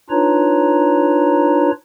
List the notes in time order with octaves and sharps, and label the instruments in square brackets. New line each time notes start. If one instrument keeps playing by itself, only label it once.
[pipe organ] D4 D#4 F4 B4 C#5 A#5